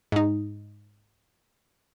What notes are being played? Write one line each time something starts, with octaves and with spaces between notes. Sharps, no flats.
G#2 D#4